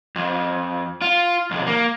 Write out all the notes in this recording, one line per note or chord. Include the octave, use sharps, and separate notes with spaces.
F2
F4
B1 F2
A#3